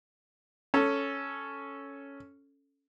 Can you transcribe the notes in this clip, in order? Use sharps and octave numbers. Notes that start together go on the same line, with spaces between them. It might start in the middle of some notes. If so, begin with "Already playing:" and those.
C#4 A4